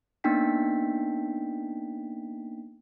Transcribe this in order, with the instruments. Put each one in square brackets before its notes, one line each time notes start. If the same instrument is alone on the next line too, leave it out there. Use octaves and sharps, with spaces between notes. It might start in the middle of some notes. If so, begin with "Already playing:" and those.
[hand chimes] A#3 B3 D4 D#4 G5 B6